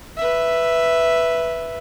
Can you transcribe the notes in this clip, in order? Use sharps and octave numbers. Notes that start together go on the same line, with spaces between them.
B4 E5